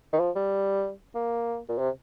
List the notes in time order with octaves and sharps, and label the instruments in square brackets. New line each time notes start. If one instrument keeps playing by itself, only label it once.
[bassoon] D#3
F3
G3
A#3
A#2
C3